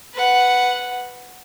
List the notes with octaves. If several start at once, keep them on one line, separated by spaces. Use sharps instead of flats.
B4 F#5